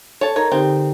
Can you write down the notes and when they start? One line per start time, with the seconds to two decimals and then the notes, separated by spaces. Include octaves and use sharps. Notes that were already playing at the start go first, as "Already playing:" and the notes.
0.21 A4 C#5 A5
0.36 D#4 A#4 C#5 A#5
0.52 D3 C4 D#4 G4